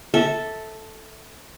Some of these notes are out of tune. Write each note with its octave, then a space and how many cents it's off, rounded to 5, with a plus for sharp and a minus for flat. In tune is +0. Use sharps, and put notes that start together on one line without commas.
A4 +0 E5 -20